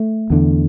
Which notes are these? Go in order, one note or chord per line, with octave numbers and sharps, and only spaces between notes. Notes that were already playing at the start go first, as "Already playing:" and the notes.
Already playing: A3
E2 D3